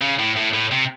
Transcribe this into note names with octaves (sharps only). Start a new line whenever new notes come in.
C#3
A2
A2
A2
C3